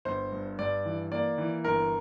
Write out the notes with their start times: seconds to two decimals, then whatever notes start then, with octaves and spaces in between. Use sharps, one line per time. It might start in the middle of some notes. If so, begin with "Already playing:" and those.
0.05 G1 C5
0.32 G2
0.59 G2 D5
0.85 E3
1.12 A#3 D5
1.38 E3
1.65 G1 A#4